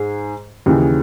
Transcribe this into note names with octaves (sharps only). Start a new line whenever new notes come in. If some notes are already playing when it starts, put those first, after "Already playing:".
Already playing: G#2 G#4
D#2 C#3 E3